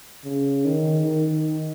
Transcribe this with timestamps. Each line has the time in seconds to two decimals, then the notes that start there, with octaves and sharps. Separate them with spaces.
0.25 C#3
0.65 D#3
1.05 D#3